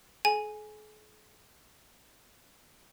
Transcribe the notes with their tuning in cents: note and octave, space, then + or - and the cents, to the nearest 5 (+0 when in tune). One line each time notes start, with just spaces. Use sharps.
G#4 +45 G#5 +0